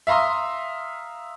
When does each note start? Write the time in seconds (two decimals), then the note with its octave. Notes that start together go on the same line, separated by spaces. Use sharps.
0.07 E5 F5 A#5 C6 D#6